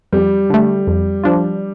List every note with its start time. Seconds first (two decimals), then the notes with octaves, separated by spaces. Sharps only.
0.13 F2 G3
0.50 D3 A3
0.87 F2
1.24 F3 D4 F4